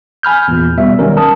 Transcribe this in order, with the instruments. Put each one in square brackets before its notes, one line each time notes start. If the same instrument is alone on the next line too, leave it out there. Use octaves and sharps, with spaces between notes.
[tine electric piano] G#5 B5 F6 G6
E2 A#2
B2 G3 B3 E5
D#3 F#3 G3 C#4 A#4
A#4 A5 D#6